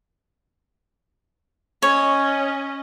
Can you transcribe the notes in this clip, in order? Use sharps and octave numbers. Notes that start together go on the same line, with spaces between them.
C#4 C#5 D#5